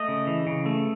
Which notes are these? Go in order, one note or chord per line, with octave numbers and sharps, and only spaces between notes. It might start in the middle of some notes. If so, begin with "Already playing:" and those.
Already playing: A3 D#5
C#3
E3
C#3
A3